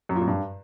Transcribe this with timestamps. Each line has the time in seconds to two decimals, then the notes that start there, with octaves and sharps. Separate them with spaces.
0.09 F#2
0.15 A#2
0.21 F#2
0.27 G2